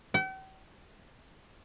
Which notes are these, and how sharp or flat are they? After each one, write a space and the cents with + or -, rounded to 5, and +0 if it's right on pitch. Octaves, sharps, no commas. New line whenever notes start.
G5 -45